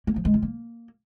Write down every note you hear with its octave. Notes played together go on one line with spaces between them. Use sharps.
A#3
F3
G#3
F4
A#3